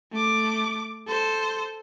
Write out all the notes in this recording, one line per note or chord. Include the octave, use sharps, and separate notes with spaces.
A3 D6
A4 C5